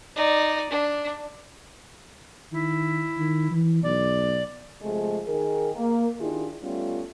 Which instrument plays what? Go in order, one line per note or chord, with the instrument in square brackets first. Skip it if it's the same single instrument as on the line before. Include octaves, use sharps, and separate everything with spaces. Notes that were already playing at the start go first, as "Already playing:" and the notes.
[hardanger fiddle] D#4 D5
D4
[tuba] D#3 [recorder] E4
[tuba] D#3
E3
[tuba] B1 [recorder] D5
[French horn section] C3 F3 G#3 A3 G#4
D#3 G#4 A#4
A#3
D#3 D4 E4 F4 G4 G#4
G3 A3 B3 C#4 F4